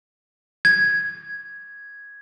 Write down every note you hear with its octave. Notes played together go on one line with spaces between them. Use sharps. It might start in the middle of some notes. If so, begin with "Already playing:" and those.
G#6